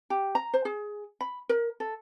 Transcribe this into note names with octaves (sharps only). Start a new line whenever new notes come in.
G4
A#5
C5
G#4
B5
A#4
A4